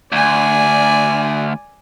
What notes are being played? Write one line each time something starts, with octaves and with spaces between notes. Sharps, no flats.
D2 D5 G#5